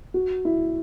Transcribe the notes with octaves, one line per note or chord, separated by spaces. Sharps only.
F#4
E4